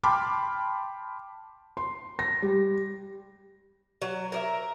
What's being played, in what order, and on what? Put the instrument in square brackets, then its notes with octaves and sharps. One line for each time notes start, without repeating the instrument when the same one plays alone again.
[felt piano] G5 A5 B5 C6 D6 F6
C6
A#6
G3
[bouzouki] F#3
A#4 D5 E5